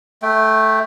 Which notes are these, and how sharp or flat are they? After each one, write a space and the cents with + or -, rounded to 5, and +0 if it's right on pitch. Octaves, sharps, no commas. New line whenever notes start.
A3 -5 G5 +0